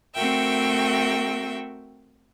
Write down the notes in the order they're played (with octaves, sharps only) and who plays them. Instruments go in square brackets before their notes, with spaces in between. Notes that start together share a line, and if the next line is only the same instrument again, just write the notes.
[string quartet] A3 C4 F#4 A#4 E5 G5